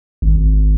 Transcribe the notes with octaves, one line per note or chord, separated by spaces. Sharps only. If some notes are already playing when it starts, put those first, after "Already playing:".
G#1